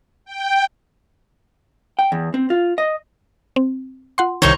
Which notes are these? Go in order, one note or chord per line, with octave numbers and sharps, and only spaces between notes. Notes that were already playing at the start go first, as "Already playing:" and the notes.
G5
G5
E2
C4
F4
D#5
C4
F4 F#5 C6
C2 D#3 D#4 C5 C#5